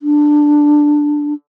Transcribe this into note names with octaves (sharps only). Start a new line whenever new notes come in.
D4